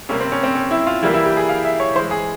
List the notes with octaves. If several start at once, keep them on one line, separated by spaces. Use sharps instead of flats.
C3 G3 A#3 C#4
C4
C#4
C4
C#4
E4
F4
E3 G3 A#3 E4
E4
G4
G#4
F5
E5
C#5
E3 G#3 C5
G#4